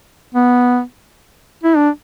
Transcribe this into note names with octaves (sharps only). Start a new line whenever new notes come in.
B3
E4
D4